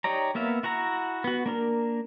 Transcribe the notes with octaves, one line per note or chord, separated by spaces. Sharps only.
D#4 G4 C#5 D5 A#5
A#3 B3 E5 F5
E4 F#4 F#5 A#5
B3 F#4
A#3 D4 A#4